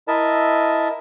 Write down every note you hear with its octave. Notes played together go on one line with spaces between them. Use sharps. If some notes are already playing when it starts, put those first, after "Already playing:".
E4 A#4 D#5 E5 A5